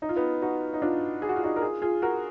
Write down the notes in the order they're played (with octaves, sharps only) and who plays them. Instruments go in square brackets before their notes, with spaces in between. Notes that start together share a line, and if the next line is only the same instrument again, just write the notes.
[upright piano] D#4
F4
B3 D#4
D#4 F#4
D#4
D4 F4
G#4
F#4
F4
D#4 F#4
A#4
F4 G#4
F4 G#4
F#4 A#4